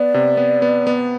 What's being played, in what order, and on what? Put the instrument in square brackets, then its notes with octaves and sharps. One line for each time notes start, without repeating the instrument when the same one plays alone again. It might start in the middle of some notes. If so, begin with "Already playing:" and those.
Already playing: [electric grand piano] B3 [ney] D5
[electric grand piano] C3
B3
B3
B3